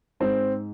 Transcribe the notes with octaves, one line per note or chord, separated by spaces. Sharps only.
G#2 C4